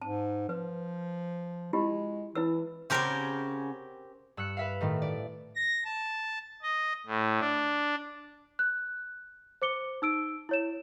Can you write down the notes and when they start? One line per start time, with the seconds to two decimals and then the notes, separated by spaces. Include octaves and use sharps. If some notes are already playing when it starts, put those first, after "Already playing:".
0.02 G#2 A5
0.49 F3 B4
1.73 G#3 E4 F4 G4
2.35 E3 E4 B4 E6
2.90 C#3 C4 C#4 F#4 G4 A#4
4.37 G2 E6 F#6 C#7
4.57 B4 E5 F5
4.81 A2 D#3 A3
5.02 D5
5.55 A#6
5.84 A5
6.62 D#5
7.06 A2
7.40 D4
8.59 F#6
9.62 C5 D6 C#7 G7
10.02 D#4 E6 D7
10.49 E4 C#5 E7